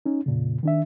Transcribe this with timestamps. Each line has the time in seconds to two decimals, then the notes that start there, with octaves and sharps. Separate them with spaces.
0.06 C#4 D#4
0.26 F2 A#2 C#3
0.63 D#3 D4 E5